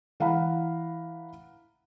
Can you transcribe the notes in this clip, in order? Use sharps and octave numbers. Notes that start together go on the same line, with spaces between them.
E3 F5 F#5 A#5 B5